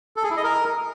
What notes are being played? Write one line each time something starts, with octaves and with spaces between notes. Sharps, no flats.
A4
G#4
E4
D#5
A#4